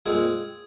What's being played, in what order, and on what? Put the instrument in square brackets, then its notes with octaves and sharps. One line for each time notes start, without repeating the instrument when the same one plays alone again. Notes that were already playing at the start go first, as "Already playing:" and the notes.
[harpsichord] A#2 G#3 C4 G#4